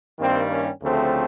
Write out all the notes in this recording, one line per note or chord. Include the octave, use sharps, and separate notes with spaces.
G2 D#3 G3 A#3 C4
C#4
D2 C#3 F3 A3 C4